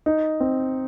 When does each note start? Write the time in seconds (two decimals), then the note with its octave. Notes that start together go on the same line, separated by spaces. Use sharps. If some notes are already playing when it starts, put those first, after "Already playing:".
0.06 D#4
0.40 C4